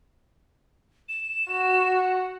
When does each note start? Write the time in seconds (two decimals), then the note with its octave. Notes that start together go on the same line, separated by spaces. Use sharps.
1.09 E7
1.50 F#4
1.96 F#5